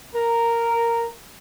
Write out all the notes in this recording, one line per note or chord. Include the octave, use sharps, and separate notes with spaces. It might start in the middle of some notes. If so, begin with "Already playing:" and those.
A#4